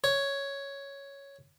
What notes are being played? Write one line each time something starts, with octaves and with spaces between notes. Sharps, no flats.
C#5